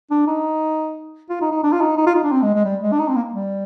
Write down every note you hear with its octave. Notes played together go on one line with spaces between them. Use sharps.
D4
D#4
F4
D#4
D#4
D4
F4
D#4
D#4
F4
D#4
D4
C4
G#3
G#3
G3
G#3
D4
D#4
C4
A#3
G3